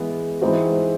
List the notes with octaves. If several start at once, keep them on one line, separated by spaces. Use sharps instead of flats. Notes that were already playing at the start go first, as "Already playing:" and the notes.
Already playing: E3 G#3 B3
E3 G#3 C4 D#4 F#4